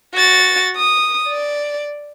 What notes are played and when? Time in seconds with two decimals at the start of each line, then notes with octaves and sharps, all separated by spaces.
0.14 F#4 A6
0.76 D#6
1.28 D5